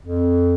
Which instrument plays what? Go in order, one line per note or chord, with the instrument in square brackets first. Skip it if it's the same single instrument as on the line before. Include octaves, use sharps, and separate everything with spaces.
[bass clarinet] F2